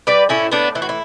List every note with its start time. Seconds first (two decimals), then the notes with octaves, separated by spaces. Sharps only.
0.07 G3 B4 D5
0.29 A2 C#4 E4
0.52 A2 B3 D4
0.75 E3 E4
0.82 F#4
0.89 E4